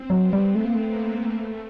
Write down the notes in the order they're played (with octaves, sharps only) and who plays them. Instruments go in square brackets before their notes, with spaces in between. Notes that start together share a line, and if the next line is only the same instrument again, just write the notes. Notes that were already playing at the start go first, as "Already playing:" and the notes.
Already playing: [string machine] C4
[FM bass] F#3
[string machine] B3
[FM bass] G3
[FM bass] A3 [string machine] B3
[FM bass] A#3
A3
[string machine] A#3
A3